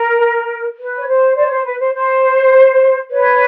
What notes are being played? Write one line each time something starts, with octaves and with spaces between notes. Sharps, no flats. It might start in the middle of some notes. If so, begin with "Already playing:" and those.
Already playing: A#4
B4
C#5
C5
C5 D5
C#5
C5
B4
C5
C5
B4 C#5